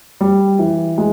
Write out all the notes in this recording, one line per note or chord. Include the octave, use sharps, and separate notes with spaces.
G3
E3
G#3